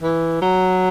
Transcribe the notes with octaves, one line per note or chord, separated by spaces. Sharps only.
E3
F#3